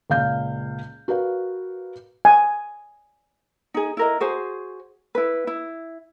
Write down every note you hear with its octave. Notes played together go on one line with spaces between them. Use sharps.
C#2 A#2 F5 G6
F#4 A#4 B4 D5 F5
G#5
D#4 G#4
E4 A#4 D#5
F#4 G#4 C5
E4 B4
E4